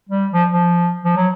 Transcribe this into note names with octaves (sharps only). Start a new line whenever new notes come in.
G3
F3
F3
F3
F#3